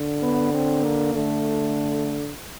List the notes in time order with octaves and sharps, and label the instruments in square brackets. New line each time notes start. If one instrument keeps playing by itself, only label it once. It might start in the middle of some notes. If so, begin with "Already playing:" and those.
Already playing: [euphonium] D3
[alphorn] B3
C4
A#3
[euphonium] D3 [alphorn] A3